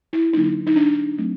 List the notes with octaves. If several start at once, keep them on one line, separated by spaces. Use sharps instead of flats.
E4
D3 F#3 A#3 D4 D#4
D#4
D4
F#3 A3 C4